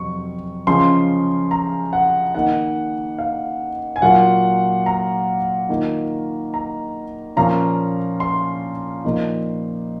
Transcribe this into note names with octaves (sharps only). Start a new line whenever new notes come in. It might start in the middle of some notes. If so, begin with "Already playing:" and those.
Already playing: F2 C3 F#3 C4 C#6
C#3 F3 G#3 C#4 C6
A#5
F#5
D#3 A#3 D#4 F#5
F5
G#5
A#2 F#3 A#3 F4 F#5
A#5
D#3 A#3 F4
A#5
A#2 F3 A#3 C#4 F4 A#5
C6
A#2 F3 A#3 D#4